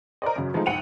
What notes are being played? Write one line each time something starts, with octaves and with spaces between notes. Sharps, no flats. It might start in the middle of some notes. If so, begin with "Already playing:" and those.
A#4 C5 D5 D#5
F#2 C#3 F#3
F3 G#3 A3 C4 D#4
F#1 B1 F#5 G5 D#7 F7